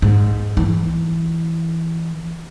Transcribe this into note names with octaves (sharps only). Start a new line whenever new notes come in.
G#2
E3